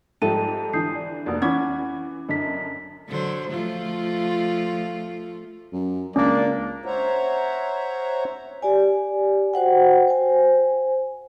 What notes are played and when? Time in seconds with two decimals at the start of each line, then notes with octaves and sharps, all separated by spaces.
0.22 G#2 F3 G3 A4 E5 G5 D#7
0.73 D3 E3 D#6 G6 C7
0.95 D5
1.26 F1 A#3 F#4 D5 D#6
1.42 E3 C#4 F#5 B5 D6 G#6
2.29 F#2 D3 D#5 B6
3.08 D3 F#3 C5
3.51 F3 A3 F4
5.73 F#2
6.16 C#2 A#3 C#4 D4 D5
6.85 C5 C#5 E5 F#5 A#5
8.62 G4 D5 G#5
9.54 F#4 C5 F#5 G5
10.08 C5 G#5